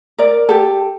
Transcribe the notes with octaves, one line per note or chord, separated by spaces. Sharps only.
A#4 D5
G4 A4